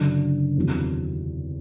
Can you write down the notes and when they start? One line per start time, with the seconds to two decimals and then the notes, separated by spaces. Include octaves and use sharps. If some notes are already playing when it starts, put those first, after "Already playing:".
Already playing: F#1 F#2 D3
0.56 E2 C3 D#3 F#3